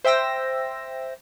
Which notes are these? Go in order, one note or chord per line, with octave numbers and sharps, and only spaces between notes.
C5 E5 G5 E6 A#6